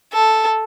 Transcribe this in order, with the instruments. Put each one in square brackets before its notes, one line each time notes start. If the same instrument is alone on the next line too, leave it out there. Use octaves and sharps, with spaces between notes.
[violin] A4